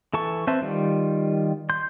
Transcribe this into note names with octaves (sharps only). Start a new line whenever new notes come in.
E3 A4 A5 C#6
C4 B4 C5 E5 A5
D#3 G3 F4
C6 G6